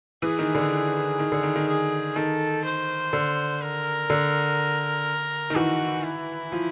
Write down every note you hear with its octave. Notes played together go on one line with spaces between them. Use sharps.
E3 G#4
D#3
D3
D#3
D3
D#3
D#3
G#4
D#3 A4
C5
D3
A#4
D3
D#3
E3 F#4
E4
F3